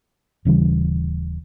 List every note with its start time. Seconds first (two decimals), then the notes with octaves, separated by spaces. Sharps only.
0.45 D#1 C#3 E3 G3